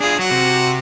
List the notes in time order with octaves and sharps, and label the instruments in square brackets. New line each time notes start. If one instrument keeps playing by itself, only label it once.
[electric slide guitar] D4 F4 [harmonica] G#4
[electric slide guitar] F#3 [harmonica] F#4
[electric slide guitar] C3